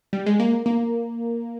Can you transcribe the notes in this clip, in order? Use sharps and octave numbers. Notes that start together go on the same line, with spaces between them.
G3
G#3
A#3
A#3